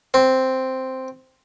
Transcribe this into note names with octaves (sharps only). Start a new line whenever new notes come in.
C4